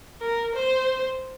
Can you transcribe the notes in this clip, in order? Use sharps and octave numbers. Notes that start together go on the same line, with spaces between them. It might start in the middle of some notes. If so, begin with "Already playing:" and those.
A#4
C5